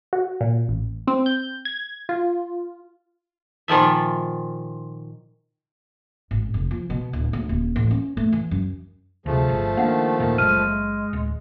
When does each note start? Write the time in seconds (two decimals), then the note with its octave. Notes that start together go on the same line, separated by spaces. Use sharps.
0.13 F#4
0.41 A#2
0.68 A1
1.07 C4
1.26 G6
1.65 G#6
2.09 F4
3.68 A#2 D#3 F3 E5
6.31 G#1
6.54 F1
6.71 F3
6.90 B2
7.13 D1
7.33 D2
7.49 D#1
7.76 A1
7.91 C#4
8.17 A3
8.32 E3
8.51 F#2
9.26 D2 C3 F3 A3 G#4
9.49 G1
9.77 D#3 A#3 D4 F5 F#5
10.20 D#1 A#2 D#3
10.38 F#1 G#3 F6 D#7
11.13 D1